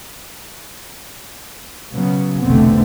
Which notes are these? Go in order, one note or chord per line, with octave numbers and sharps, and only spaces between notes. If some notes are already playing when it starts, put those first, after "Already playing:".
C#3 F#3 B3
F1 B1 D3 A3 B3 C4